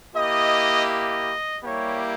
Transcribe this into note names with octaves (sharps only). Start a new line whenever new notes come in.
A#3 E4 G4 D#5
D#5
G3 A#3 E4 G4 C#5